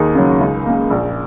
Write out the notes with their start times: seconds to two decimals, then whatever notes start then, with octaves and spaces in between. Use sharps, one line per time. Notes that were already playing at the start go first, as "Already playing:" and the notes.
Already playing: D#2 D#4 G#4
0.15 C#3 F#3
0.41 C#2
0.66 C#3 A#3
0.90 A#1